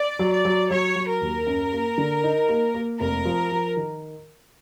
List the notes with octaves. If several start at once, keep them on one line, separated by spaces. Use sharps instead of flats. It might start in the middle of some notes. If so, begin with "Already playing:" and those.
Already playing: D5
F#3
D5
F#3
F#3 C#5
F#3
A#4
D#2
F#2
A#3
D3
D#4
A#3
A#3
F1 A#4
F3
F3
D#3